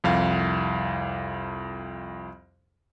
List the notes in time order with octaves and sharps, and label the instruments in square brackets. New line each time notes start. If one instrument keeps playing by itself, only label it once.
[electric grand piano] C2 F2 F5